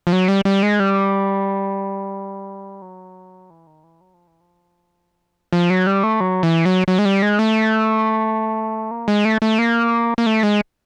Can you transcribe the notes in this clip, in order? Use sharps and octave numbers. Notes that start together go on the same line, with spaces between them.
F3
F#3
G3
G3
G#3
G3
F#3
E3
D#3
E3
F#3
F3
E3
F3
F3
F#3
G3
A3
F#3
E3
F#3
F#3
G#3
G3
G#3
A3
A#3
G#3
A3
A3
A#3
A#3
A3
G#3